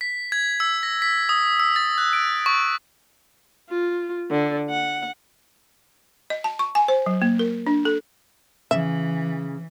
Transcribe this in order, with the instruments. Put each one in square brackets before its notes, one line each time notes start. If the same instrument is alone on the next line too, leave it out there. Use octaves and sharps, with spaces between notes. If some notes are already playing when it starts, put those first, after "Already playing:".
[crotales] B6
G#6
E6
A#6
B6
D#6
E6
A6
F#6
D7
C#6
[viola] F4
D3
F#5
[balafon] D#5
A5
C#6
G#5
C5
F#3
A#3
A#4
D4
A4
[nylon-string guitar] C#3 [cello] E3 [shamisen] E5